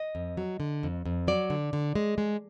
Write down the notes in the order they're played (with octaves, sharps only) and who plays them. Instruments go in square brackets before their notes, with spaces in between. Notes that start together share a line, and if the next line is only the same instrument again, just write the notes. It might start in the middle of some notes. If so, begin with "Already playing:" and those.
Already playing: [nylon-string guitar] D#5
F2
F#3
D3
F2
F2
F#3 D5
D3
D3
G#3
G#3